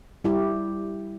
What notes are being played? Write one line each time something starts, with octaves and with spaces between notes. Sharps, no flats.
G3 E4 G4